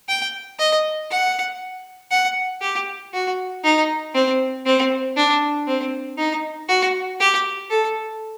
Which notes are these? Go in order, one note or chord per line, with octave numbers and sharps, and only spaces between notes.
G5
D#5
F#5
F#5
G4
F#4
D#4
C4
C4
D4
C4
D#4
F#4
G4
A4